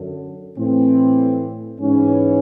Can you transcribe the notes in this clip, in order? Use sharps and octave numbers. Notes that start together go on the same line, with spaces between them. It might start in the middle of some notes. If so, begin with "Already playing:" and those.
Already playing: F#2 D3
A2 E3 C4
G#2 E3 C#4